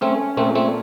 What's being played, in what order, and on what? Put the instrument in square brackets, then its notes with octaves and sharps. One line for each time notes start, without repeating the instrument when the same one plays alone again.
[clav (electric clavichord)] A3 C4 [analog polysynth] C#4
[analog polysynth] A#2 [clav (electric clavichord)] A3 C4
[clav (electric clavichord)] A3 C4